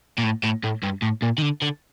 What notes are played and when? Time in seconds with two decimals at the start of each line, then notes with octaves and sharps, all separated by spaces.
0.18 A#2
0.23 A2
0.43 A2
0.63 A2
0.83 G2
1.02 A2
1.22 A#2
1.38 D#3
1.42 D3
1.62 D3